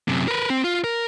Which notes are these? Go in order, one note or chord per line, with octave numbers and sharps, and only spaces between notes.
F#2 C3
A#4 B4
C4
F4
A#4